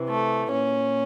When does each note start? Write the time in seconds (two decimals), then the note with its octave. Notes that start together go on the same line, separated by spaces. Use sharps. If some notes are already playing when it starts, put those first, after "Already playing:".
Already playing: C3 E3
0.09 A3
0.50 A#2 C#4